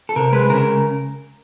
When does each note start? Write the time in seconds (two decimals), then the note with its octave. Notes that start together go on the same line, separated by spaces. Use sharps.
0.09 A4
0.16 C3 A#4
0.32 G#3 B4
0.50 C#3 A#4